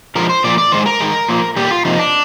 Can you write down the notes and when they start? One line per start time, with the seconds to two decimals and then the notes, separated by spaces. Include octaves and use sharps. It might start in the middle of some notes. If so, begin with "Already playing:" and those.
0.15 D3 F3 G#3 A#4
0.29 C5
0.44 A#2 F3 A#3 D5
0.58 D5
0.72 D#3 G#3 C5
0.86 A#4
1.00 D#3 G#3
1.28 A#2 F3 A#3
1.56 A#2 G3 A#3 G4
1.71 F4
1.85 C3 F3 A#3 D#4
1.99 D4